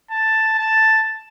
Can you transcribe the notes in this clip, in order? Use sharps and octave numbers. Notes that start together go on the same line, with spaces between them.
A5
A5